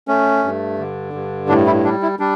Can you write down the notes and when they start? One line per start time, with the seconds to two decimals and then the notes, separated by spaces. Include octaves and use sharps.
0.08 A3 C#4
0.44 G2
0.79 D3
1.13 G2
1.49 A2 D4
1.66 E4
1.84 G3 D4
2.02 E4
2.19 G3 D4